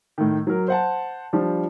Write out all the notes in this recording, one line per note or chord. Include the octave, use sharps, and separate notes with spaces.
A2 D#3
F#3 A#4
C5 F#5 A5
F3 G3 D4